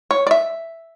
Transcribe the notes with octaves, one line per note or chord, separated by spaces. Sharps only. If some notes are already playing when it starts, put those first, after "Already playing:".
C#5
D5
E5